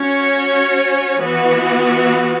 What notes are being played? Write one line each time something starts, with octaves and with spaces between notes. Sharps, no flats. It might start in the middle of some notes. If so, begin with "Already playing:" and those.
Already playing: C#4 F#4 C#5
E3 B3 F#4